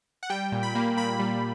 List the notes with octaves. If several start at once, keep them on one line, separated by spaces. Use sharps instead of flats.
F#5
G3 G5
A#2
B5
A#3
A#2 B5
G3